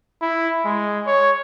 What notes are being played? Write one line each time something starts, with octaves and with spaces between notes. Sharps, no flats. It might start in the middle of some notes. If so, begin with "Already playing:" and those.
E4
G#3
C#5